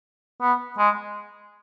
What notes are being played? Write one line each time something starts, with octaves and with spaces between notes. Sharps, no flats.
B3
G#3